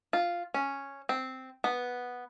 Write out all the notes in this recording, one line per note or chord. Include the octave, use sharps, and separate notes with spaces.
F4
C#4
C4
B3